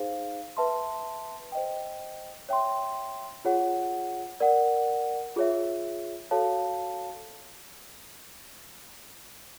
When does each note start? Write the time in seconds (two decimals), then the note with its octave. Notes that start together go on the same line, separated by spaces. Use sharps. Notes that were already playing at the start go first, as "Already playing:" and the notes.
Already playing: D#4 G#4 C5 F5
0.57 B4 E5 A5 C6
1.52 C5 D#5 G5
2.49 C#5 E5 G5 C6
3.45 F4 G#4 C#5 F#5
4.40 A#4 D5 F#5
5.36 F4 G#4 C#5 E5
6.31 F#4 A4 C#5 F5 A5